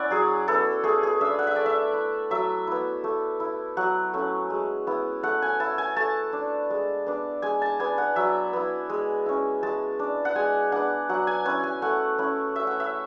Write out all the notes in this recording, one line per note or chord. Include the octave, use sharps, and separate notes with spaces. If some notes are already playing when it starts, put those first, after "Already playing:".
Already playing: C#4 E4 D5 F#5 G#5
F#3 G#4
B3 E4 A4
A3 G#4
G#4
D4 E5
F#5
E5
A3 D5
E5
E4
F#3 E5
B3 E4
A3
E4
F#3 F#5
A3 C#4
G#3
B3 E4
A3 F#5
G#5
E4 A5
G#5
A3 A5
D4
G#3
B3 D4
G#3 G#5
A5
B3 D4 G#5
F#5
F#3 E5
B3 E4
G#3
C#4 E4
G#3 A5
D4
F#5
G#3 G#5
B3 D4 F#5
F#3 F#5
G#5
C#4 E4 G#5
G#5
A3 F#5
C#4 E4
A3 E5
F#5
E5